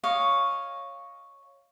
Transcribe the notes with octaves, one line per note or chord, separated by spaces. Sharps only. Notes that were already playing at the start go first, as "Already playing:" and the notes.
C#5 D#5 F5